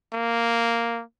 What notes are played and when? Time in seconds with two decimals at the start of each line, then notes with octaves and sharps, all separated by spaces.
0.13 A#3